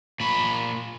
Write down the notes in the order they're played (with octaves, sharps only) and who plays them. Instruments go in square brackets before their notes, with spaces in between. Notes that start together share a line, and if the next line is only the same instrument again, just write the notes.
[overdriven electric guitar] A#2 B5